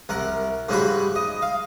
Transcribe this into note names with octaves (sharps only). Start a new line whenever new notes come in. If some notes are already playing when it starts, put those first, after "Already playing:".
C2 A#4 F#5
G#2 C#3 F#3 G3 F#4 B5
D#5
F5